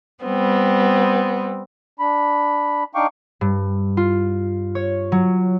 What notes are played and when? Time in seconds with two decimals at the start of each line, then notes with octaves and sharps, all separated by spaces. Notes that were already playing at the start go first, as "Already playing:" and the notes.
0.22 G3 B3 C4
1.99 D4 B5
2.95 D4 D#4 F5 G5 C#6 D6
3.41 G2
3.97 F4
4.75 C#5
5.12 F#3